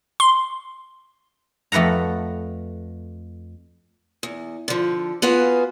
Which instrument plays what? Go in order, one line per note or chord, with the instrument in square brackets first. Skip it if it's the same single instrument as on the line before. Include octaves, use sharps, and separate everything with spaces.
[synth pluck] C6
[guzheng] F2 A3 B4 F#5 A#5
[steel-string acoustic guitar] E2
D3 F3
B3 F4 F#4 G#4 B4 F5